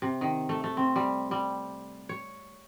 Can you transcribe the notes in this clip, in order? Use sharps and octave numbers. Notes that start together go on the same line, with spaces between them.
C3
D#3
A3
A3
C4
G3
G3
C#5